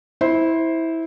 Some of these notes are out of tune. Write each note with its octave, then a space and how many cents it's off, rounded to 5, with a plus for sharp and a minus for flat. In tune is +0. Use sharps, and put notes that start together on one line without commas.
E4 -15 C5 +0